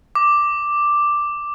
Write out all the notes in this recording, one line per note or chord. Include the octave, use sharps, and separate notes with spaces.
D6